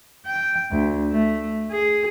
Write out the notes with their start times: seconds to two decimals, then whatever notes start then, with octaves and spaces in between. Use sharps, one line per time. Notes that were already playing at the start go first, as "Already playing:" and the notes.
0.26 G5
0.72 D2
1.12 A3
1.71 G#4